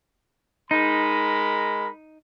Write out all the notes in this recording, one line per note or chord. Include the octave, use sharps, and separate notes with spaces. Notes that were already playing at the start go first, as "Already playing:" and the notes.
G#3 D#4 A#4 B5